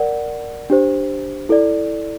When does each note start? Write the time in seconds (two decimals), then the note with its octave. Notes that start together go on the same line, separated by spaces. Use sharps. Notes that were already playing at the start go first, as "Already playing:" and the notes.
Already playing: A#4 D5 F#5
0.70 D4 G4 C5
1.49 E4 A4 D5